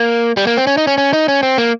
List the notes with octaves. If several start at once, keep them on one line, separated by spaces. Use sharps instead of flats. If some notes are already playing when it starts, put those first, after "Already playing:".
Already playing: A#3
G3
A#3
C4
C#4
D#4
C#4
C#4
D#4
C#4
C4
A#3